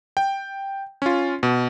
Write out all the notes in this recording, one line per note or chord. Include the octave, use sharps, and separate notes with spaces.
G5
C#4 F4
B2